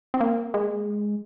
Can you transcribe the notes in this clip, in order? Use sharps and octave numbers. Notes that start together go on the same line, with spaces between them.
C4
A#3
G#3